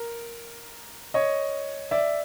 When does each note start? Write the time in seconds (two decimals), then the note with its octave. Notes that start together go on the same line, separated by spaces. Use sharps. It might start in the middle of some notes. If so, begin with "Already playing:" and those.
Already playing: A#4
1.14 C#5 D#5
1.91 D5 E5